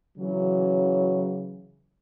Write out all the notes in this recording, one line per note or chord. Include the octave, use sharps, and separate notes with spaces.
C#3 E3 F#3